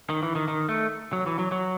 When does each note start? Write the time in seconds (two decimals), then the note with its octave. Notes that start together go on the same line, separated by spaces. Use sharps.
0.10 D#3
0.23 E3
0.35 D#3
0.48 D#3
0.69 A3
1.13 F#3
1.26 E3
1.39 F#3
1.52 F#3